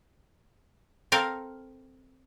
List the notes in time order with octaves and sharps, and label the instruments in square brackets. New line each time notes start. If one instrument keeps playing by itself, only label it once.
[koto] C4 A4 A#4 F5